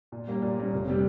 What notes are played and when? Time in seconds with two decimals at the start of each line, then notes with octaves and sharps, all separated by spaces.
0.12 A#2
0.27 G3 A#3 C#4
0.42 A#2
0.58 G3 A#3 C#4
0.73 F1
0.88 C3 G3